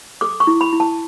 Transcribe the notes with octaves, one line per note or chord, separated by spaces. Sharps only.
A4 D6
C#6
E4
B5
E4
A5